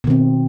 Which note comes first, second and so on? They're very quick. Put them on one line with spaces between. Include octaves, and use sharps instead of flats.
B2 D#3 C4